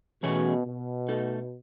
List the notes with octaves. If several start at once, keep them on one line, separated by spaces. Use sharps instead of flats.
B2 E3 A3 C#4 G#4 C#5
B2
A3 D#4 A4 D#5